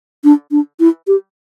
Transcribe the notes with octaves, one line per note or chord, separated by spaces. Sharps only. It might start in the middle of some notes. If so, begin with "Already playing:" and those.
D4
D4
E4
G4